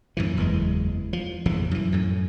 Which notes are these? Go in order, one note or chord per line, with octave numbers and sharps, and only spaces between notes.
F#2 A#2 E3
F#1 E2 E3 G#3
F3
A#1 F2 C#3 E3
F#2 E3
F#2 A2